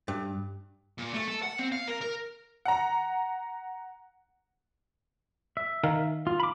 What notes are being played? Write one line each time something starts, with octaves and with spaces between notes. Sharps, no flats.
G2
A#2
A3
A4
F#5
C4
F5
A#4
A#4
F#5 A#5
E5
D#3 A#4 F5
F4
B5 D6